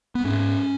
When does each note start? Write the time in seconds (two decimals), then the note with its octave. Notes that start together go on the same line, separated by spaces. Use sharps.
0.15 B3
0.25 G#2 C#4